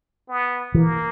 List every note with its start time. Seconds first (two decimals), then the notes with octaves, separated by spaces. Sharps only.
0.28 B3
0.74 E3 A#3